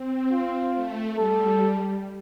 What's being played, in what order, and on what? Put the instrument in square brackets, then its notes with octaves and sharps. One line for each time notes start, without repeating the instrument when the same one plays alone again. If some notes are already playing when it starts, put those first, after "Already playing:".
Already playing: [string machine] C4
[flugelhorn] F4
[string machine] A3
[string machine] G3 [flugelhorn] A4